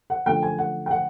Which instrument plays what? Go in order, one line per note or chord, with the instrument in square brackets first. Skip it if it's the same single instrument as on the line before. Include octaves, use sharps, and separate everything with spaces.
[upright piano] F#5
F#2 D3 F3 A3 G5
G#5
F#5
G5
F#5